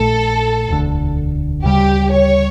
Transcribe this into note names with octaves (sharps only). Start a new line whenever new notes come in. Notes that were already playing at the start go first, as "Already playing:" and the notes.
Already playing: A#1 A#2 A3 A4
E1 D2 D3
D2 C#3 E3 G3 G4
C#5